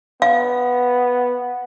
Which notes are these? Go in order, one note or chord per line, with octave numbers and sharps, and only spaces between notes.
B3 F5